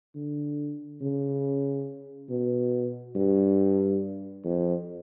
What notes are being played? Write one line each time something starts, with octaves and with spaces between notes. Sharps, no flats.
D3
C#3
B2
G2
F2